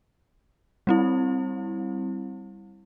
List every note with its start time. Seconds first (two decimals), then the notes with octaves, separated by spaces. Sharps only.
0.87 G3 C4 E4